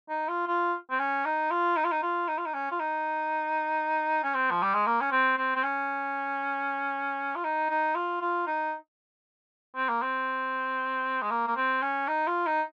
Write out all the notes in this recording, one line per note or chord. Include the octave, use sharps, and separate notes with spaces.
D#4
F4
F4
C4
C#4
D#4
F4
D#4
F4
D#4
F4
D#4
F4
D#4
C#4
F4
D#4
C#4
C4
F3
G3
G#3
A#3
C#4
C4
C4
C4
C#4
F4
D#4
D#4
F4
F4
D#4
C4
A#3
C4
G#3
A#3
A#3
C4
C#4
D#4
F4
D#4